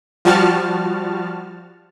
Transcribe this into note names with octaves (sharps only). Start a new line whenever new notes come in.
F3 G3 F#4 A5 F6